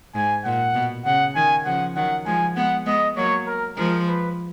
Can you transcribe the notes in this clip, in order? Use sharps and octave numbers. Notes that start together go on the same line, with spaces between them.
G#2 G#5
A#2 F#5
B2
C#3 F#5
D#3 G#5
C#3 F3 F#5
D#3 F#3 F#5
F3 G#3 G#5
G#3 B3 F#5
G#3 B3 D#5
F#3 A#3 C#5
A#4
F3 G#3 A#4
B4